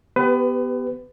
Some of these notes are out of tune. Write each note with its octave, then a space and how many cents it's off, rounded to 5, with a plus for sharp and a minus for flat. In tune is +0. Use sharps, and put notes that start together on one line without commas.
B3 +5 G4 +0 B4 +30